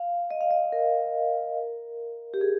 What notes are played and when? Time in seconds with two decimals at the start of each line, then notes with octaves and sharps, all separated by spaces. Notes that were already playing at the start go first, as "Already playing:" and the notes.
Already playing: F5
0.31 D#5
0.41 F5
0.51 D#5
0.72 A#4
2.34 G4
2.41 G#4